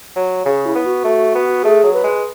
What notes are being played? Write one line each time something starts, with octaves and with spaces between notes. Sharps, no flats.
F#3
C#3 G#4
E4
B3
F#4
A3
B3
A3 G#4
F#3
B4
G#3